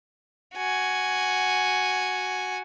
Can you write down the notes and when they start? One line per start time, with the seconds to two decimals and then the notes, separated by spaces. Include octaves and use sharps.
0.56 F#4 G#5